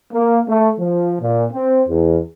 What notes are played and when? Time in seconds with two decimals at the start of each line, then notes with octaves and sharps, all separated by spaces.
0.12 A#3
0.48 A3
0.78 F3
1.21 A#2
1.53 C4
1.88 E2